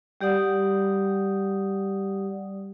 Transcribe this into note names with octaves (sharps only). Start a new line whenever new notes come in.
G3 G4 D5 F#5 D#6